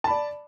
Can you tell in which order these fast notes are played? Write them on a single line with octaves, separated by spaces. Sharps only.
A5 B5 D5